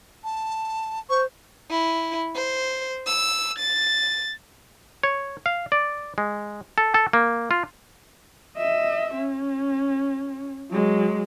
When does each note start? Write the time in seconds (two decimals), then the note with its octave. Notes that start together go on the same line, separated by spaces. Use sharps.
0.24 A5
1.10 C5 C#6
1.70 E4
2.35 C5
3.06 E6
3.58 A6
5.03 C#5
5.46 F5
5.72 D5
6.18 G#3
6.78 A4
6.94 A4
7.13 A#3
7.51 F4
8.58 D#5 E5
9.15 C#4
10.71 F#3 G#3